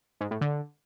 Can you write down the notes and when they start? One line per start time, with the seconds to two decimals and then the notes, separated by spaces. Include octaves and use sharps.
0.21 G#2
0.31 A2
0.41 D3